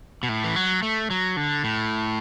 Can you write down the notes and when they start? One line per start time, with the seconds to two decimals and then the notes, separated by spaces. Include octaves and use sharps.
0.23 B2
0.29 A2
0.44 E3
0.56 F#3
0.83 A3
1.10 F#3
1.37 D3
1.64 A2